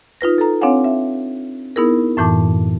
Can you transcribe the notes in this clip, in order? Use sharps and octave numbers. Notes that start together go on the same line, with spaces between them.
D#4 F4 B4 A#6
A4 A#5
C4 D4 C#5 F5 F#5 G#5
E5
B3 D#4 E4 G#4 A#4
F#2 A2 E3 A5 D6